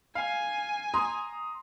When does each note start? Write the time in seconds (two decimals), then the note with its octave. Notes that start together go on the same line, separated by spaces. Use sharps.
0.15 F5 G#5
0.94 A#5 C6 D#6